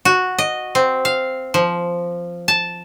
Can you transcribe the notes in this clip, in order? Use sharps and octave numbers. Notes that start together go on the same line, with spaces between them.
F#4
D#5
C4
F5
F3
A5